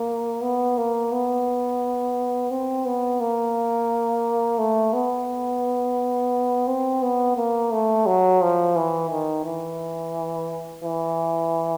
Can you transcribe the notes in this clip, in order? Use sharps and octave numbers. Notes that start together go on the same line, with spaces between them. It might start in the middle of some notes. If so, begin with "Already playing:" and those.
Already playing: A#3
B3
A#3
B3
C4
B3
A#3
A3
B3
C4
B3
A#3
A3
F#3
F3
E3
D#3
E3
E3